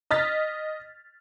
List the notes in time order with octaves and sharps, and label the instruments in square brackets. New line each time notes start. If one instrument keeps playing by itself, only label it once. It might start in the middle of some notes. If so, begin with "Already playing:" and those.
[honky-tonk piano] D#5 F6 A6 B6